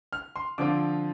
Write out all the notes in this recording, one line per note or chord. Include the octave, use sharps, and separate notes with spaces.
F6
C6
D3 F3 C4 F4 D6